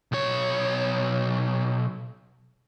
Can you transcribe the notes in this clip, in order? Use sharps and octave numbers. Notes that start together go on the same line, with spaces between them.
B1 C#5